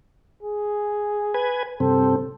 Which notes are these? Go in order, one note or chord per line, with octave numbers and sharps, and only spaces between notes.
G#4
B4 G#5
G2 C3 C4 A4